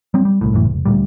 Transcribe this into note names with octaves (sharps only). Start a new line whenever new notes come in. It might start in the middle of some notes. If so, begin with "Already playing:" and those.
F#3 G3 C4
G3
C2 A2
G1 F#2 A2 E3
F1 C#2
D2 A#2 G3